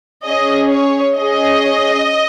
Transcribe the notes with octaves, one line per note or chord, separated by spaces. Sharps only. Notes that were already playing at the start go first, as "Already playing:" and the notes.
C#4 G#4 D#5
C#5
C#4 G#4 D#5